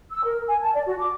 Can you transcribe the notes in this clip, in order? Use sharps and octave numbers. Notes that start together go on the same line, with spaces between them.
E6
A#4
G#5
A5
D5
F#4
D6